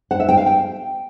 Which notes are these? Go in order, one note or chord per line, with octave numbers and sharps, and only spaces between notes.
F#5
E5
G5
F5
G5